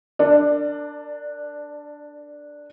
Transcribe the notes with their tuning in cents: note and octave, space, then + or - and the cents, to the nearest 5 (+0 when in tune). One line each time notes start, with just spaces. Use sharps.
D4 +0 A#4 -30 D5 +20